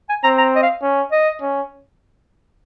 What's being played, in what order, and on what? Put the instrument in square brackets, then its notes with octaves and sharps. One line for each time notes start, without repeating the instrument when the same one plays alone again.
[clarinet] G#5
[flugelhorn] C4 [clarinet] A#5
[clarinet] A#5
D#5
F5
[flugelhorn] C#4
[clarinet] D#5
[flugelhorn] C#4